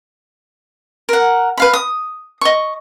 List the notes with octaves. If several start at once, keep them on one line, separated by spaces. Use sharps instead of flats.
A#4 F#5
B4 F5 B5
D#6
D#5 C#6